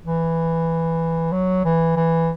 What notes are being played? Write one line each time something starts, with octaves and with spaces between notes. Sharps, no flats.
E3
F#3
E3
E3